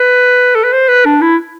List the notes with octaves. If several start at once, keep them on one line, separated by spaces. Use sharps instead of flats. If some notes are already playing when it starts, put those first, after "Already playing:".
Already playing: B4
A4
B4
C5
B4
D4
E4